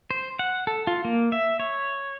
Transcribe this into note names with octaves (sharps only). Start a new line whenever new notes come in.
C5
F#5
A4
F4
A#3
E5
C#5